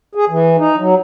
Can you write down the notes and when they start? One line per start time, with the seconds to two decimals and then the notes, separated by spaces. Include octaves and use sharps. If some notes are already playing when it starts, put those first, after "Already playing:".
0.15 G#4
0.30 E3
0.58 D#4
0.78 F#3